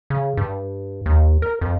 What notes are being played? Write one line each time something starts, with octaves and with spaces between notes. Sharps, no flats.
C#3
G2
D#2
A#4
F2